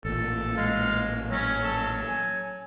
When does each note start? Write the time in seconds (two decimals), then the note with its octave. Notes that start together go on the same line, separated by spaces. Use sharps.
0.05 A1 A#2 A4
0.57 G#3 F5
1.30 F#3 C#4
1.63 A4
2.08 G#5